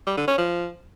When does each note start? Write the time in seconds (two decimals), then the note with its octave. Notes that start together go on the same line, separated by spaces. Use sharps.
0.07 G3
0.17 D3
0.27 C#4
0.38 F3